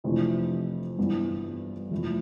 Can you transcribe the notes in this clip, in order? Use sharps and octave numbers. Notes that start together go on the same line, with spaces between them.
F2 C3 E3 A3 D4
G1 G2 E3 B3
F1 F2 E3 A3 E4